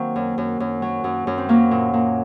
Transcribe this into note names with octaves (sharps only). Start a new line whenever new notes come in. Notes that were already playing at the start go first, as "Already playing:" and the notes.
Already playing: D#3 F#3 A#3 C4
F#2
F#2
F#2
F#3
F#2
F#2
C4
F#3 A#3
A#2
A#2